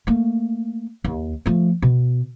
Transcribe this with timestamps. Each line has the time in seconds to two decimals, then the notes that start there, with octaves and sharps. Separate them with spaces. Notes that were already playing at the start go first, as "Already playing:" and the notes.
0.07 A3 A#3
1.04 D#2
1.46 F3 A3
1.82 B2